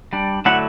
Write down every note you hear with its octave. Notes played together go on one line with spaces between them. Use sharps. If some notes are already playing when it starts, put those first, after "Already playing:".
G3 D4
D3 F#3 A3 E4 F#5